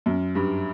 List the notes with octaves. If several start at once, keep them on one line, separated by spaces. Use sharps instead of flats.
F#2
G2